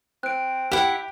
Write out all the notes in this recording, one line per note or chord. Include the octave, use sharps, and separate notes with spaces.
C4 F#6 D7
E4 G4 F#5